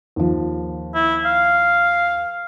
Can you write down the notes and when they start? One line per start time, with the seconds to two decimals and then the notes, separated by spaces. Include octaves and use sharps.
0.16 D#2 F3
0.94 E4
1.25 F5